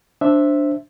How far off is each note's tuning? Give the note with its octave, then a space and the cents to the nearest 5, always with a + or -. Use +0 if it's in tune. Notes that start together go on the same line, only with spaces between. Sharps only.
D4 +0 C5 +10 E5 +0